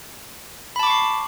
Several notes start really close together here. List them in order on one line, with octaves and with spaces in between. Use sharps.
B5 A5 D6 C#6 C7